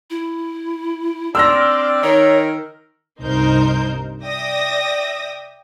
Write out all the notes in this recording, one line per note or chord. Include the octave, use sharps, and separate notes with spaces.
E4
C4 D4 D5 C6 E6 F6 A#6
D#3 A#4 C#5
C2 G2 D#4 A#4 C5 G6
D5 E5 G5 D#6 A#6